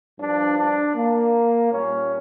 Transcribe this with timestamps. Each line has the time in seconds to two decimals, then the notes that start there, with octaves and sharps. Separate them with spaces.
0.20 G2 F3 D4
0.58 D4
0.95 A#3
1.71 A#2 G3 C#4